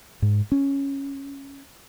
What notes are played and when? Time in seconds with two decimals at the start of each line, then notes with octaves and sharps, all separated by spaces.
0.22 G#2
0.52 C#4